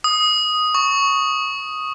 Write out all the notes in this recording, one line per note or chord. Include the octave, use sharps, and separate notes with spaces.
D#6
C#6